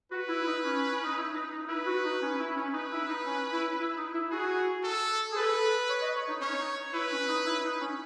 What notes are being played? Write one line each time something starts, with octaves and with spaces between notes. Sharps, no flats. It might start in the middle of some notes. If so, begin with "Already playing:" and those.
F#4 B4
E4
E4
D#4
C#4
C#4
D#4
E4
D#4
D#4
E4 B4
F#4
D#4
C#4
E4
C#4
D#4 B4
E4
D#4
C#4
E4
E4
D#4
E4
F#4 G#4
A4
G#4
A4 B4
C#5
D#5
C#5
D#4
C#4 C#5
D#4
E4 B4
C#4
D#4
E4
D#4
C#4